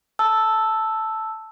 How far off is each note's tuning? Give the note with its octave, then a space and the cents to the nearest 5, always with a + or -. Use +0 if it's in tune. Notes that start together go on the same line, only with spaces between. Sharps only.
A5 +0 E6 +0